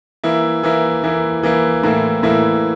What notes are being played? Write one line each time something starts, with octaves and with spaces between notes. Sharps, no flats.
E3 A#3 E4
E3 A#3 E4
E3 A#3 E4
E3 A#3 E4
A2 E3 A#3 E4
A2 E3 A#3 E4